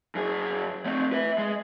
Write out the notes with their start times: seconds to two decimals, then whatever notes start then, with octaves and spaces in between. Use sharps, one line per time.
0.15 F#2 G#4
0.86 A3 C4
1.12 B4 E5
1.38 G#3